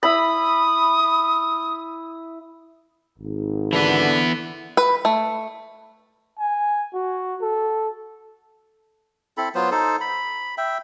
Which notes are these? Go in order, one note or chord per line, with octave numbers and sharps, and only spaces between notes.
E4 B5 D#6
G#1
D3 E3 B3
B4
A3
G#5
F#4
A4
C4 E4 A4 B5
F#3 B3 F4 C5
D#4 A4 C5
B5
E5 G5